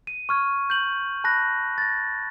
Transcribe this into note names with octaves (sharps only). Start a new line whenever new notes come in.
D#7
C#6 F6 G#6
G6 F#7
A5 B5 F#6 A#6
A6 A#6